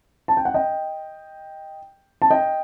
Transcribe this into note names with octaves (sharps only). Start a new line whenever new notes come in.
A5
G5
F#5
D#5 G5
A5
D#5 G5